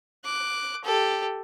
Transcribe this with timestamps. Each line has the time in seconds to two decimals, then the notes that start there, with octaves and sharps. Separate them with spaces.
0.25 D6 F#6
0.84 G4 A4